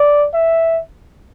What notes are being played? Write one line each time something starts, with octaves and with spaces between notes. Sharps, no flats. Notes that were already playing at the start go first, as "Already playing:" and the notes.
Already playing: D5
E5